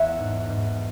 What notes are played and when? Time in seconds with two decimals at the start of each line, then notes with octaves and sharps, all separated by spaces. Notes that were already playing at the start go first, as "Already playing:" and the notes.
Already playing: E2 B4 C#5 E5 F#5
0.18 G#2
0.49 G#2